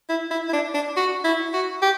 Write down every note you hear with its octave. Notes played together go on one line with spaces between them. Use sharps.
E4
E4
E4
D4
D4
F#4
E4
F#4
G4